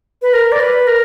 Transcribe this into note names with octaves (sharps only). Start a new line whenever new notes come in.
B4
A#4
D5
B4
A#4